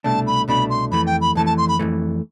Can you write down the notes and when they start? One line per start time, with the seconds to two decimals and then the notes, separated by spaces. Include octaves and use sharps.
0.04 C2 B2 A3 D4 A5
0.26 B5
0.48 C2 B2 A3 D4 B5
0.70 C6
0.91 F2 E3 A3 B5
1.06 G5
1.21 B5
1.35 F2 E3 A3 A5
1.46 A5
1.57 C6
1.68 B5
1.79 F2 E3 A3